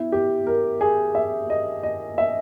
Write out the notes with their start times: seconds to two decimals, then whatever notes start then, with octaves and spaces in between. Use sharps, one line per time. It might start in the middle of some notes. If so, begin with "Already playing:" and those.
Already playing: B2 E4
0.12 G4
0.47 A#4
0.81 G#4
1.15 E5
1.50 D#5
1.83 D#5
2.18 E5